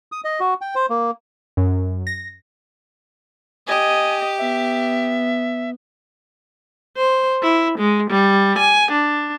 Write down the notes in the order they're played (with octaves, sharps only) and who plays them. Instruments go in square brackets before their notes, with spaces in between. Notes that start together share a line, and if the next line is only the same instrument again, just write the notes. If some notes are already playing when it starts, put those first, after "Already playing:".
[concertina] D#6
D#5
F#4
G5
C5
A#3
[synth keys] F#2
A#6
[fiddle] G4 [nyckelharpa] D#5 [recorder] G#5
[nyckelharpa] B3 [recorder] E5
[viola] C5
E4
G#3
G3
G#5
D4